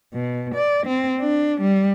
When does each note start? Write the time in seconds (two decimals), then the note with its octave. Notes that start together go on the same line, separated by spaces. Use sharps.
0.13 B2
0.55 D5
0.87 C4
1.20 D4
1.61 G3